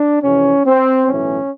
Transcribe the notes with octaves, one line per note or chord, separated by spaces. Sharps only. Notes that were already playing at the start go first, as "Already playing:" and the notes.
Already playing: D4
F2 C3 E3 C#4
C4
B1 A2 E3 C#4